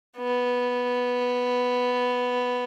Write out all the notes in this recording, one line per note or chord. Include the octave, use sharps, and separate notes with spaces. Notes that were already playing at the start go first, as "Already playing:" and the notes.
B3